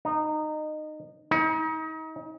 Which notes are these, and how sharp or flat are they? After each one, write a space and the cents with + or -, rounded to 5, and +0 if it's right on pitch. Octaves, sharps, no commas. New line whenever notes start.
D#4 -20
D#4 +35